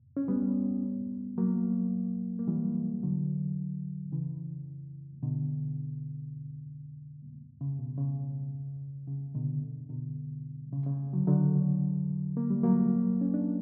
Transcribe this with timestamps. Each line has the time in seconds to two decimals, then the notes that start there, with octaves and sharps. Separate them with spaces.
0.17 C#4
0.28 G3 B3
1.38 F#3 A#3
2.39 A#3
2.48 E3 G3
3.03 D3 F#3
4.12 C#3 E3
5.23 B2 D3
7.61 C#3
7.79 B2
7.98 C#3
9.08 C#3
9.35 B2 D3
9.89 B2 D3
10.72 C#3
10.86 C#3
11.13 D3 F#3
11.27 D3 F#3
12.37 A#3
12.50 G3
12.63 F#3 A#3
13.21 C#4
13.34 D4